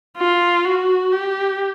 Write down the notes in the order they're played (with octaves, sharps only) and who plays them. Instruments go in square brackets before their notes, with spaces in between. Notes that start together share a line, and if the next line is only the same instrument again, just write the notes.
[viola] F4
F#4
G4